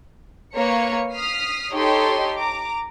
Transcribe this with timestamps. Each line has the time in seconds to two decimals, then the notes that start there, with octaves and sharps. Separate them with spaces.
0.56 A#3 B4 C#5 C#7
1.13 D#6 F6 B6 C7
1.73 D#4 G4 A4 C#5 D#5 C6
2.37 A#5 D6